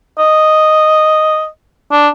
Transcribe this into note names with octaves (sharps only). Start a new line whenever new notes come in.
D#5
D4